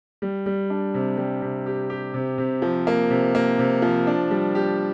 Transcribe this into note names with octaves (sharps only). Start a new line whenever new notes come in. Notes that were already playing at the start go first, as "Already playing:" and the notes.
G3
G3
D4
C3
G3
C3
G4
G4
C3
C3
F3
A#3
C3
A#3
C3
F3
D4
G3
G4